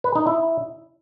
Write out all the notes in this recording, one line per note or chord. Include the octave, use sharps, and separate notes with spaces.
B4
D#4
E4